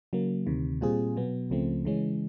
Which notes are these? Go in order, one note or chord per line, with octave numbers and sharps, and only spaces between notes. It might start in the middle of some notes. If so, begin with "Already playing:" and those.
C#3 F#3 A#3
D2 C3 D#3
A#2 G3 C4 F4 G#4
B2 F#3 B3
C#2 C#3 F3 A3 C4
C#3 E3 G#3 C#4